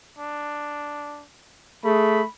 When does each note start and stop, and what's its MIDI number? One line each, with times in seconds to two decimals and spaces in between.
0.19 1.24 62
1.84 2.25 57
1.84 2.22 68
1.84 2.29 83